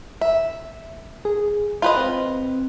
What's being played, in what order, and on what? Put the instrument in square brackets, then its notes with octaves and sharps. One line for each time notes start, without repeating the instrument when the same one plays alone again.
[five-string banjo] E5
[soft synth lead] G#4
[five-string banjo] F4 B4 D#5
[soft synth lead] C4